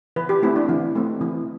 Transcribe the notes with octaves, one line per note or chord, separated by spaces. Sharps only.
E3 B4
G4
A3 C4 E4
D4
E3
A3 C4
E3